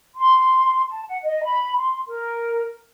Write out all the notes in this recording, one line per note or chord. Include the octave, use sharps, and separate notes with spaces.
C6
A5
F#5
D#5
B5
C6
A#4